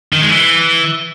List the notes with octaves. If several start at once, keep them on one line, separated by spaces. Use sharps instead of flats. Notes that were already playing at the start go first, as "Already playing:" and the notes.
D#3
G#3
E3